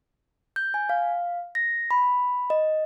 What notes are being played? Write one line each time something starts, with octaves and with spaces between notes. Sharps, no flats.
G6
G#5
F5
A#6
B5
D#5